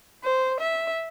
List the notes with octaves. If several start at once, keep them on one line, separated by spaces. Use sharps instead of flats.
C5
E5